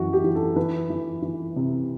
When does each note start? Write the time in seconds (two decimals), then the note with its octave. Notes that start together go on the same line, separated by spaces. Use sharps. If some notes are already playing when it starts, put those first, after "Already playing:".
Already playing: F#2 E3 F#4
0.13 G4
0.24 E3
0.35 A4
0.56 E3 B4
0.90 E3
1.22 E3
1.56 C3